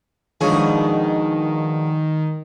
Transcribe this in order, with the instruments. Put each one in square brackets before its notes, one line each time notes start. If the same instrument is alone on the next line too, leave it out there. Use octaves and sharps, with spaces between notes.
[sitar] B2 G#4 [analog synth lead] D#3 [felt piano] F3 D4 [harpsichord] G#3 C#5 G#5